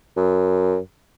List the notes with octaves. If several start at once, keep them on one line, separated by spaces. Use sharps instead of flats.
F#2